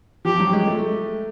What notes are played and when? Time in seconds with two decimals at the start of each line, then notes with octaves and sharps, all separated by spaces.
0.25 F3 G4
0.39 F#3
0.53 G#3
0.67 A3